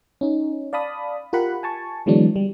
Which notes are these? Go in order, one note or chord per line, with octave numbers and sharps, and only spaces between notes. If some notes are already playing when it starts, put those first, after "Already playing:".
C#4 D#4
D5 F5 A5 B5 D#6
F4 G4 A#4 F#5 B5
G#5 A5 C#6
D3 E3 F#3 G#3 B3 D4
G3